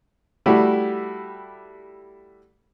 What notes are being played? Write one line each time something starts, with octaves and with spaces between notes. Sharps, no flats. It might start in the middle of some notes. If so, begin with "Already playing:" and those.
G3 A3 E4 F#4 G4